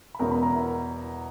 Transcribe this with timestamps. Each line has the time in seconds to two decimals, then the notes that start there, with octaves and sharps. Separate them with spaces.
0.15 B5
0.19 E2 B2 G#3 C#4 E4 A#4 A#5
0.31 B4 B5
0.43 A#4 A#5
0.54 E4 E5